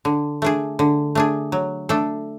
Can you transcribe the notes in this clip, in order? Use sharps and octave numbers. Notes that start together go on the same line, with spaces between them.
D3
A3 D4 G#4
D3
A3 D4 G#4
F#3
A3 D4 A4